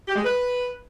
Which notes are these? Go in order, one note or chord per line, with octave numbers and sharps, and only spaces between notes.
G4
G#3
B4